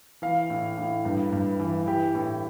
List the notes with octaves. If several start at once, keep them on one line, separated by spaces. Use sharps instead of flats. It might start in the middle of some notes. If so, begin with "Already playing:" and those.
E3 F5
A2
A2
G2
G2
E3
E3 G4
A2